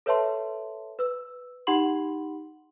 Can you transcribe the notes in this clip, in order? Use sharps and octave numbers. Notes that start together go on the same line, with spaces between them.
A4 B4 C#5 E5 A5 C6
B4 E6
D#4 G4 F#5 B5 C6 F#7